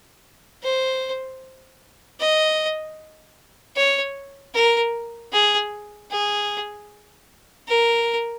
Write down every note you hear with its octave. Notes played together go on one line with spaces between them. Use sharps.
C5
D#5
C#5
A#4
G#4
G#4
A#4